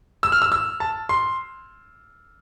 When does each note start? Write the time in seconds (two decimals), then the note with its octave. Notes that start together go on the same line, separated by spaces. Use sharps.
0.23 E6
0.32 F6
0.42 E6
0.52 E6
0.80 A5
1.09 C6